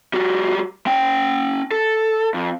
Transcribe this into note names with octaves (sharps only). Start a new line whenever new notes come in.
G3 F#4
C#4 G5
A4
F2